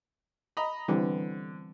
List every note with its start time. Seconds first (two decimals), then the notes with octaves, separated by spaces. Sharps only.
0.57 D#5 A#5 B5
0.88 D3 E3 G3 C4